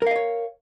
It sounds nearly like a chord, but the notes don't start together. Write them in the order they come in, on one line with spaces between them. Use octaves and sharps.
A#4 F5 D#5 C#5